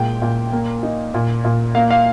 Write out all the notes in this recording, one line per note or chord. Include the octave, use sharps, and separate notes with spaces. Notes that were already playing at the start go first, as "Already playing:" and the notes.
Already playing: A#2 G#3 G5
A#2
A#3
D#4
A#2
A#2
A#3 F5
F5